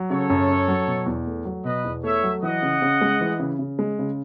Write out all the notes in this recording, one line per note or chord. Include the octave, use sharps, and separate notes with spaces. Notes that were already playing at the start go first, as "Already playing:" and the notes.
Already playing: F#3
C#3 A4 C#5
F#2
C#4
F#3
B2
E2
A3
F#3
B2 B4 D#5
E2
A3 C#5 E5
F#3
E3 D#5 F#5
C#3
C#3
G#3
E3
C#3
C#3
G#3
C#3